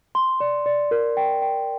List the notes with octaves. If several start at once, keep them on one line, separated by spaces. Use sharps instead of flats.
C6
D5
D5
A#4
G5
G5